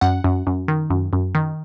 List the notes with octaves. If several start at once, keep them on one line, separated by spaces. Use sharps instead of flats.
F#2 F#5
F#2
F#2
D#3
F#2
F#2
D#3